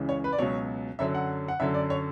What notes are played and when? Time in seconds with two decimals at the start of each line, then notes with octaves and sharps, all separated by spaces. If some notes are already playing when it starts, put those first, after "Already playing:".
Already playing: C#2 C#3 E3
0.09 C#5
0.24 B4
0.33 D5
0.39 C#2 B2 F#3 C#5
0.99 F#2 D3 F#3 E5
1.15 F#5
1.48 F#5
1.60 F#2 D3 F#3 E5
1.74 D5
1.90 C#5